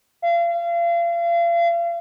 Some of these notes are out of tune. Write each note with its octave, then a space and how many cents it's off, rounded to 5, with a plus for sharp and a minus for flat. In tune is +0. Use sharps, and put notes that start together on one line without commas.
F5 -35